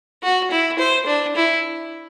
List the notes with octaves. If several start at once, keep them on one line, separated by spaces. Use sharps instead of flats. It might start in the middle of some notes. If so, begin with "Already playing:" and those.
F#4
E4
C5
D4
E4